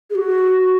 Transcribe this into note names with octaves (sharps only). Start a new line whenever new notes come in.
G#4
F#4